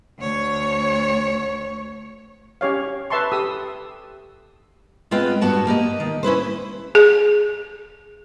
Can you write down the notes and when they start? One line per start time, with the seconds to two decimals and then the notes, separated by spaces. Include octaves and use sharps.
0.19 D2 C#5
2.61 C#4 G4 C#5 F5
3.10 B4 E5 A5 C6 C#6
3.32 G4 A4 D#6 E6
5.11 G#3 B3 C4 F4 G5
5.41 G2 B3 F#4 A5
5.67 A#3 G4 D#5
6.00 D#3
6.23 C#4 E4 B4 C5
6.95 G#4